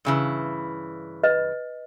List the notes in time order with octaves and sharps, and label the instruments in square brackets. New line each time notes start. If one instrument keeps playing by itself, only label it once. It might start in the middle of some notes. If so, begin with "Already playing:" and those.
[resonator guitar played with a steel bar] G2 C#3 E3
[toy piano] B4 D#5